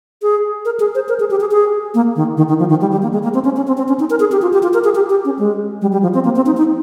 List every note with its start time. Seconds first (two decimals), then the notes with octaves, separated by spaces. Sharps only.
0.22 G#4
0.65 A#4
0.80 G#4
0.95 C5
1.09 A#4
1.20 G#4
1.31 G4
1.40 G#4
1.51 G#4
1.94 A#3
2.16 D#3
2.37 D#3
2.49 D#3
2.59 F3
2.70 D#3
2.81 G3
2.92 G3
3.02 A#3
3.13 G#3
3.23 A#3
3.34 C4
3.45 C#4
3.56 C#4
3.67 C4
3.78 C4
3.88 C#4
3.99 D#4
4.10 A#4
4.20 G#4
4.32 G4
4.42 F4
4.53 G4
4.63 F4
4.74 A#4
4.84 G#4
4.95 G4
5.10 G4
5.25 C#4
5.39 G#3
5.82 G3
5.92 G3
6.02 F3
6.14 C4
6.24 A#3
6.36 C4
6.46 D#4
6.57 D#4